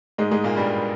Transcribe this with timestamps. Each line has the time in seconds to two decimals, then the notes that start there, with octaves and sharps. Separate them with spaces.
0.18 G#2 G#3
0.31 G#2 G#3
0.44 A#2 A#3
0.57 G2 G3